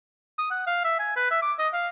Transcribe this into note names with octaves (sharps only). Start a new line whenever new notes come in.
D#6
F#5
F5
E5
G#5
B4
E5
D6
D#5
F5